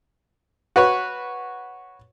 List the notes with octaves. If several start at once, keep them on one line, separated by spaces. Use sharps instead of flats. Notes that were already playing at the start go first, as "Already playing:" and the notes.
F#4 B4 C#5